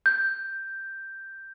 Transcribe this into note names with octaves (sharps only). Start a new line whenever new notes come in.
G6